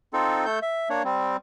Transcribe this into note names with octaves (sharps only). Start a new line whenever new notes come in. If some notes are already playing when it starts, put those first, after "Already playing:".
C4 D#4 F4 A4
A3 A4 G6
E5
A#3 D4 C#5
G3 C4